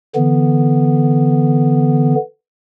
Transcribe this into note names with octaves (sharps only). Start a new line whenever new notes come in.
D3 E3 B3